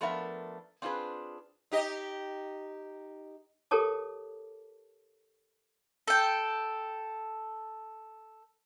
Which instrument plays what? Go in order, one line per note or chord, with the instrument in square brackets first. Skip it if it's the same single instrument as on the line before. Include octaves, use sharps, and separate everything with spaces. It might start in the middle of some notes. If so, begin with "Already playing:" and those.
[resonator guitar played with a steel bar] F3 A3 B3 D4 A#4 E5
C4 D4 F4 G#4 B4
[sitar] D#4 G4 D#5
[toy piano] G4 A4 A#4 C#5 A5 D6
[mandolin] A4 G5